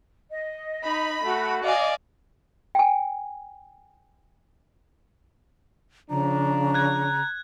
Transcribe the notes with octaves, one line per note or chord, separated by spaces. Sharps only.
D#5
D#4 B5
A3 F#4
D5 D#5 F5 G#5
G5 G#5
C#3 F3 D4 A#5
F#6 G#6